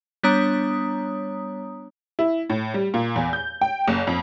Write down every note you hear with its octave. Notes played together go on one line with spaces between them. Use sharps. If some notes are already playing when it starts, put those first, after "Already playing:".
G3 B3 D4 C#5 A#5 D#6
E4
A2
G3
A#2
E2
G6
G5
F#1
F2